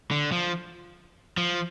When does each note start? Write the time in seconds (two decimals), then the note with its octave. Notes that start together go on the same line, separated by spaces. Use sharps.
0.11 D3
0.32 F3
1.37 F3